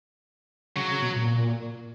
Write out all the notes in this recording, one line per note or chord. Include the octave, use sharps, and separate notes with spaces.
C#3 F#3
C#3
B2
A#2